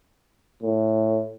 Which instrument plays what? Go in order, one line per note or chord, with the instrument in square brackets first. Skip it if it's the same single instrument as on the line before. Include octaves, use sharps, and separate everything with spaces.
[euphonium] A2